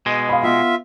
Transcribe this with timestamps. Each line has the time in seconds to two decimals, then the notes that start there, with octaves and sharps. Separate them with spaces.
0.06 B2 G#3
0.29 F5 B5
0.43 B3 F4 E5